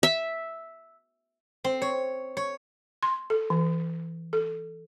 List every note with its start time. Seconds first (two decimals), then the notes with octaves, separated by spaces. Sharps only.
0.03 E5
1.64 C4
1.82 C#5
2.37 C#5
3.03 C6
3.30 A4
3.50 E3
4.33 A4